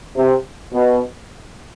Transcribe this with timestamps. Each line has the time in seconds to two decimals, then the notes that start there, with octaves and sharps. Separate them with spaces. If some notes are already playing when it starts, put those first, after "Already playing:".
0.16 C3
0.73 B2